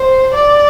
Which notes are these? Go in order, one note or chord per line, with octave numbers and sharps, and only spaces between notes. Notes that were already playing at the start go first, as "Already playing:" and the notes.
Already playing: C5
D5